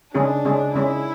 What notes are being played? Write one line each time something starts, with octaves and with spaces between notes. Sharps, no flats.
C#3 G#3 C#4 D4 G#4
C#3 G#3 C#4 G#4
C#3 G#3 C#4 E4 G#4